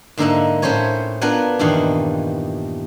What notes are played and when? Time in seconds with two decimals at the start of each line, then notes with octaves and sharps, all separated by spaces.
0.18 G#2 D3 A#3 D#4 E5 F#5
0.62 A2 A3 C#4 C5 C#5 G#5
1.21 B3 D4 F4 A#4 F#5 G#5
1.59 E2 G2 A#2 D#3 F5 F#5